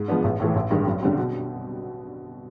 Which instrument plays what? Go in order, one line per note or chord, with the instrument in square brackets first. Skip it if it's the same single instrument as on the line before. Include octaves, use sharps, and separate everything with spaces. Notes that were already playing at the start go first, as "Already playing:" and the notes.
Already playing: [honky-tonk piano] G#2
F3 G#3 B3 D4
A1
A2 E3 A3
A1
G2 D#3 G#3
F#2
D3 G3 C4
B2